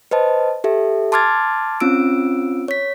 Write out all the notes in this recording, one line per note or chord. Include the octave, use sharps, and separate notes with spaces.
B4 C5 D#5 A5
G4 A4 E5
A5 C6 D6 F6 G#6 A6
C4 C#4 F4 E6 D7
C#5 B6